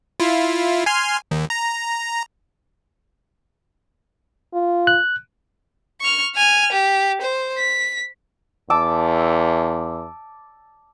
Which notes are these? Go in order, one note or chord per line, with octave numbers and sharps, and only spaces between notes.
E4 F4
G#5 C6 F6
D#2
A#5
F4
F#6
C#6 F6
G#5 F6
G4
C5
B6
E2 A5 D6 E6